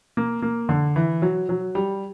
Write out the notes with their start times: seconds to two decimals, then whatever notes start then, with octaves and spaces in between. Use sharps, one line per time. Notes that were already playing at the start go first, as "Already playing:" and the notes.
0.17 A#3
0.42 A#3
0.69 D3
0.96 E3
1.22 F#3
1.49 F#3
1.75 G3